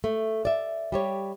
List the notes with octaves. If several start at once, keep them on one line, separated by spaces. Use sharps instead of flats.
A3
D5 E5
G3 G4 C#5